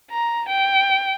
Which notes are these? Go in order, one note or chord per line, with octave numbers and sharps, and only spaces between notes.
A#5
G5